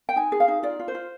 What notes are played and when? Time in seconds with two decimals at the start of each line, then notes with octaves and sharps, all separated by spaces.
0.09 G5
0.16 D#4 G#5
0.32 G#4
0.40 F5
0.48 D#4
0.63 F4 D5
0.79 F4
0.88 C5
0.95 F4